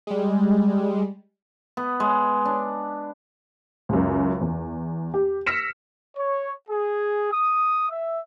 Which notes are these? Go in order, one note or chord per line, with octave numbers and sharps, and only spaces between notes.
G3 G#3
B3
G#3
D4
C#2 F#2
E2
G4
E6 F6 A#6 B6 C#7 E7
C#5
G#4
D#6
E5